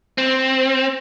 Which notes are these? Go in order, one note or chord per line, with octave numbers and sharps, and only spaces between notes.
C4